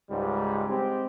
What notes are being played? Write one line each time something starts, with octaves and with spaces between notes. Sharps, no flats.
C#2 G#2 G3
G#3 C4 G4